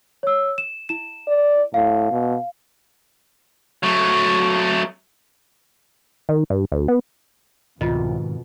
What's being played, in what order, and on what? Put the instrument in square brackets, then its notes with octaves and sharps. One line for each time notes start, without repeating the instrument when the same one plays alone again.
[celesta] C#5 E6
E7
E4 E7
[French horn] D5
[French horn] A2 [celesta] F5
[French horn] B2
[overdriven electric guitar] F#3 A3
[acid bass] D#3
G2
D2
B3
[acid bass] C2 [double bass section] F2 B2 [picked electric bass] G#2 D#3 [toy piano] E4 F4 D#5